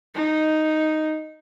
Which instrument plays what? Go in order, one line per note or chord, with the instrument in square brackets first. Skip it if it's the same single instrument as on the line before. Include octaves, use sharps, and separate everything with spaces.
[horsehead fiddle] D#4